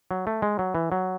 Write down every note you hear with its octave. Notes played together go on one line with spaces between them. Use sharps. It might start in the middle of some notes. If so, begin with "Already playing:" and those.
F#3
A3
G#3
F#3
E3
F#3